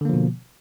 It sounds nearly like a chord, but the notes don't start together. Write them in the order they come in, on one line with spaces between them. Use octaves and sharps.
D3 A#3 F3 B2